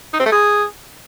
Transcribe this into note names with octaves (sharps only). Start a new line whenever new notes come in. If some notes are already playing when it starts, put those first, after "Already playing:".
D#4
C4
A3
G#4